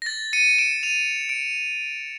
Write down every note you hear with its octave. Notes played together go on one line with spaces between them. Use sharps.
A#6
A6
C#7 D#7
D7 E7
D#7 F7
D7